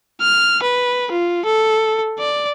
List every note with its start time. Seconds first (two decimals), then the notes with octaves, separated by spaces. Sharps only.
0.21 F6
0.63 B4
1.12 F4
1.45 A4
2.19 D5